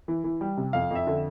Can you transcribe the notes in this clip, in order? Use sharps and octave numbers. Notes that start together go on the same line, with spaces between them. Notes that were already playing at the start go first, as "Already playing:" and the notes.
E3
E3
G3
C3
F2 F5
F2 E5
D3